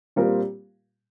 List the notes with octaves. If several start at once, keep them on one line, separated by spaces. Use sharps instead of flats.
A#2 G3 C4 F4 A#4